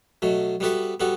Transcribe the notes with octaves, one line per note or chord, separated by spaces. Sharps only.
B2 F#3 A3
G3 B3 F#4 A4 E5
G3 B3 F#4 A4